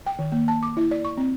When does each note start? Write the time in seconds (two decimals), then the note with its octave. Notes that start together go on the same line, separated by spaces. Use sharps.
0.06 G5
0.19 D#3
0.32 A#3
0.48 A5
0.63 D6
0.77 E4
0.91 D5
1.05 C#6
1.17 C4